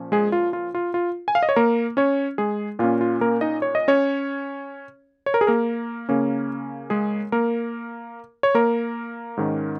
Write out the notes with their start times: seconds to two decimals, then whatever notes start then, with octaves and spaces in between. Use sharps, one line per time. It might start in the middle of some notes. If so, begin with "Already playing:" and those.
Already playing: A#2 F3 C#4
0.12 G#3 G#4
0.32 F4
0.53 F4
0.75 F4
0.94 F4
1.28 G#5
1.35 F5
1.43 D#5
1.49 C#5
1.56 A#3 A#4
1.97 C#4 C#5
2.38 G#3 G#4
2.79 A#2 A#3 C#4 F4
3.01 F4
3.21 A#3 A#4
3.41 D#4 D#5
3.62 C#5
3.75 D#5
3.88 C#4 C#5
5.26 C#5
5.34 A#4
5.41 G#4
5.47 A#3 A#4
6.09 C#3 A#3 C#4
6.90 G#3 G#4
7.32 A#3 A#4
8.43 C#5
8.54 A#3 A#4
9.37 G#2 D#3 C#4